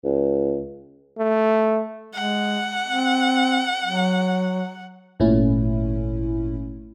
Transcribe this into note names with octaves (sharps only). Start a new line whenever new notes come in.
C#2
A3
G#3 F#5
C4
F#3
G#1 A#2 A3 C#4 E4